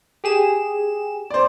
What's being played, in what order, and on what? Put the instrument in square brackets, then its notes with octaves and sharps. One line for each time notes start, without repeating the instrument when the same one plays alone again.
[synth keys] G4 G#4 E7
[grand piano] C5 D5